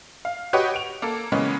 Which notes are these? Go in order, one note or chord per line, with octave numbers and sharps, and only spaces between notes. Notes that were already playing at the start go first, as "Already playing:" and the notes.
F5
F#4 G4 B4 C#5 D#5
D7 F7
A#3 A4
C#3 E3 G#3 A#3 B3 C#4